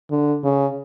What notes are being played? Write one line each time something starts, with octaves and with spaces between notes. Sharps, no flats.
D3
C#3